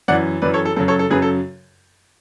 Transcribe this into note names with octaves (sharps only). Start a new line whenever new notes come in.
F#2 E3 D5 F#5
F#2 E3 B4 D5
A4 C#5
A4
F#2 C#3 F#3 A4
A4 C#5
A4
F#2 C#3 F#3 G#4 B4
A4